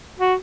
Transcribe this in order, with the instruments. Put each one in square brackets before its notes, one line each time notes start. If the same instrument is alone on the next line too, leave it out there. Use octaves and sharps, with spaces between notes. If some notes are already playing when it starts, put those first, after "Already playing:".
[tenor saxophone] F#4